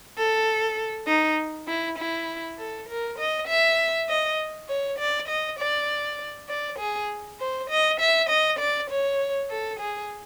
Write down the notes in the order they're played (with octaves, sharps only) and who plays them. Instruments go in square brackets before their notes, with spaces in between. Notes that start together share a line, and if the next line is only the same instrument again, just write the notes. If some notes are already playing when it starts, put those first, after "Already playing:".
[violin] A4
D#4
E4
E4
A4
A#4
D#5
E5
D#5
C#5
D5
D#5
D5
D5
G#4
C5
D#5
E5
D#5
D5
C#5
A4
G#4